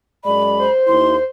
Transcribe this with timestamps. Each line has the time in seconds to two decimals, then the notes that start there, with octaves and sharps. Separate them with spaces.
0.25 F#2 G#3 D5 B5
0.59 C5
0.88 D#2 E4 C6